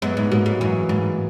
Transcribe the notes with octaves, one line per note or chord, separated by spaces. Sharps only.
F#2 G#3 B3
G#2
G#2 F#3 A#3
G#2
F#2 E3
G#2